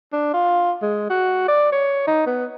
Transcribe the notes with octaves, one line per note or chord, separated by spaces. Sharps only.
D4
F4
G#3
F#4
D5
C#5
D#4
B3